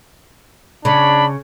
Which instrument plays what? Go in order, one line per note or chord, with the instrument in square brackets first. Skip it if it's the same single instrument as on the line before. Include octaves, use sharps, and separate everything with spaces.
[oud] C#3 [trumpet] D4 [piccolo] B5